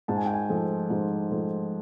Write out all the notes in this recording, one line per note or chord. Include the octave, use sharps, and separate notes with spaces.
G#2 A5
G#5
G5
G#5
F3 A3
G#2
F3 A3